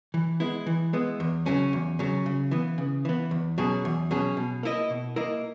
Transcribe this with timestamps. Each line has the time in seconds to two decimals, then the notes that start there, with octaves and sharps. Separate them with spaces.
0.14 E3
0.40 G#3 B3 E4
0.66 E3
0.93 G#3 B3 E4
1.20 E2
1.46 C#3 F#3 C#4
1.73 E2
1.99 C#3 F#3 C#4
2.26 C#3
2.51 E3 B3
2.78 C#3
3.05 E3 B3
3.31 E2
3.58 B2 F#3 C#4 G#4
3.85 E2
4.11 B2 F#3 C#4 G#4
4.37 B2
4.63 A#3 E4 A#4 D#5
4.90 B2
5.16 A#3 E4 A#4 D#5